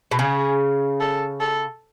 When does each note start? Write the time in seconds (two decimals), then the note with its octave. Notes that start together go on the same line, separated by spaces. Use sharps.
0.11 B2
0.18 C#3 G#4
1.00 A4
1.41 A4